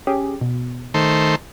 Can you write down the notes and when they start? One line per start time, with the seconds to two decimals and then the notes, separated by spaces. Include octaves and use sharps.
0.07 C#4 G4 G#4
0.41 B2
0.94 D#3 A3 C5